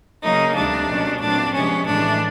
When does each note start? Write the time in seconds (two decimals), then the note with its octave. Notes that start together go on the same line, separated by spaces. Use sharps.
0.23 C#3 F#3 A#3 C#4 D#4
0.55 D2 C3 D#3 G3 D4
0.89 B2 F#3 A#3 C#4
1.21 A#2 F#3 A3 C4 D4
1.53 C3 F3 G#3 B3 C#4
1.86 A2 E3 G#3 D4